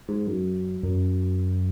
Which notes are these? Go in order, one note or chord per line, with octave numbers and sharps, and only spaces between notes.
G#2
F#2
F#2